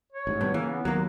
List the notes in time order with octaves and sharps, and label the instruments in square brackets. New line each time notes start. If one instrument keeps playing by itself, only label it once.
[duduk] C#5
[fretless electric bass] A1 G#2
[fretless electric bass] G#1 B2 B3 [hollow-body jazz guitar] G2
[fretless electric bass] C#3 [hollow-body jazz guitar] E3 [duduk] A#3
[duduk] B3
[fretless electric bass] D#2 [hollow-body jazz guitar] F#3 A#3